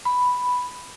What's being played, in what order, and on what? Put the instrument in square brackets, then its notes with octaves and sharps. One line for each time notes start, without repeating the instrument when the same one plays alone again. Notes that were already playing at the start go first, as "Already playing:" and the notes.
[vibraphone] B5